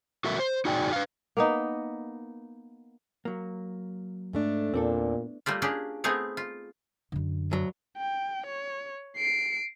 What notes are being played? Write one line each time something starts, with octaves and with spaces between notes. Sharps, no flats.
F#4 A4 A#4 E5
C5
D#4 F#4 G#4 D5 G5
B4 F5
A#3 B3 D#4
F#3 A#3
G#2 A3 D4
E2 A#2 C4 D4 A4
G3 A3 A#3 F4
A#3 C#4 D4 G4 G#4
A3 B3 C4 D#4 G#4 C#5
F4
F#2 D3
D2 F#3
G5
C#5
C7 D7